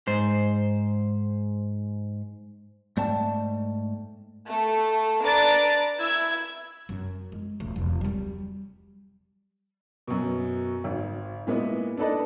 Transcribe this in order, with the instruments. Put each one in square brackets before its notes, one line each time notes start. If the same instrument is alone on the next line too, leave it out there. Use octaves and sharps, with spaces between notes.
[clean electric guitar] G#2 C5
G#2 A3 D5 G5 A5
[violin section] A3
D4 B4 A#5 A6 D7
E4 E6 G#6
[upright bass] F#2
G#3
D#1 A3
E1 C#2
F#3 G3
[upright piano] F#2 B2
G#1
A#2 G#3 B3 E4
D4 D#4 A4 B4 D5 D#5